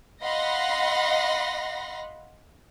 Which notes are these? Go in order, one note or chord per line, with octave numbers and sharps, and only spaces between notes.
D#5 F5 F#5 B5 C6 A#6